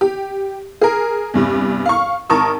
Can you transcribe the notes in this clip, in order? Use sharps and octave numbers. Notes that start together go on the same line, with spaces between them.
G4
G#4 A#4
E2 G2 C3
F5 C#6
G#1 A#4 A5 C#6 D#6